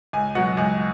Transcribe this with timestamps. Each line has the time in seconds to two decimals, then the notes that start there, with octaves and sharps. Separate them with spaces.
0.13 C#2 G#5
0.35 B2 F#3 F#5
0.57 C#2 G#5